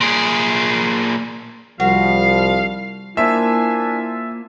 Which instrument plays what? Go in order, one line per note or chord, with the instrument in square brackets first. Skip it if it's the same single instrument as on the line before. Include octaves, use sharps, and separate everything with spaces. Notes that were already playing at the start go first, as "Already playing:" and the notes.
[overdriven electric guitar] A#2 G#4
[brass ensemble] C2 F3 [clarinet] G3 [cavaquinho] F#4 [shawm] F5
[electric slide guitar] A#3 F4 C5 [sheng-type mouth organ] D4 G#5 [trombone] E4 [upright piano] E5